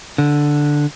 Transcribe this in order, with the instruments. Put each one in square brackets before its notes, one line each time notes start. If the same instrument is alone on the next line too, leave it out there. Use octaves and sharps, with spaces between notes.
[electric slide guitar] D3